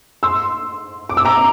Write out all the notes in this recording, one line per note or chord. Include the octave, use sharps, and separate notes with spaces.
C6 E6
D6
E6
A#5 D6